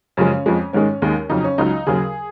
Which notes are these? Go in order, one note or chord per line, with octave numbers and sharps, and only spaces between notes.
F#2 C#3 F3 G#3 C#4
F2 F3 G#3
G#2 D#3 G#3 C#4
D#2 D#3 G#3
F2 C#3 F#3 D#4
C#4
C#2 C#3 F#3 D#4
D#2 C#3 F#3 G#4